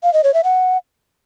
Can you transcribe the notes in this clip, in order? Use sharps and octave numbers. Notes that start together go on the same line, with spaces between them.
F5
D#5
C#5
E5
F#5